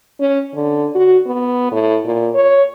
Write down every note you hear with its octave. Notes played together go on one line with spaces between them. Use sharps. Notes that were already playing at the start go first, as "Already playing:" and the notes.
C#4
D3
F#4
B3
A2
A#2
C#5